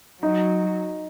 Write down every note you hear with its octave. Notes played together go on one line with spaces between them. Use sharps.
F#3 D#4